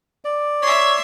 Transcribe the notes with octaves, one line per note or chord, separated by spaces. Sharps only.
D5
C#5 E5 C6